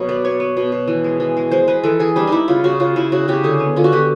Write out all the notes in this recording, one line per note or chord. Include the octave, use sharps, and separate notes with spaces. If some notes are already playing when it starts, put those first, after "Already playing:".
Already playing: B2 F#3
B3 D5
B3 C#5
B3
B2
B2
E3
G#3
E3
G#3
G#3 C5
G#3 B4
E3 A4
E3 G#4
G3 D4
G3 D#4 E4
C#3 F4
C#3 F#4
C#3 F4
C#3 E4
C#3 F#4
C#3 G4
D3 G#4
B3
D3 F4
F#4
D3 G4